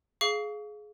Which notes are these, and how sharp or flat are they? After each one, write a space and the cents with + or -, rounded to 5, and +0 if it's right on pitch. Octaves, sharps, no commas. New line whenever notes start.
G#4 +20 F5 +0 C#6 +40